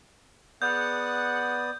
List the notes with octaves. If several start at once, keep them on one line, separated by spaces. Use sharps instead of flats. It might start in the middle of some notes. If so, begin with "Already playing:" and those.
B3 G#4 D5 F#5 D#6 G6